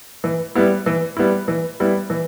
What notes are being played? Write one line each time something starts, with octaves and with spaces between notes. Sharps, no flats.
E3
G3 B3 E4
E3
G3 B3 E4
E3
G3 B3 E4
E3